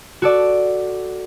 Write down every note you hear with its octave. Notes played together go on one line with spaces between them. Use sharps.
F#4 A4 D5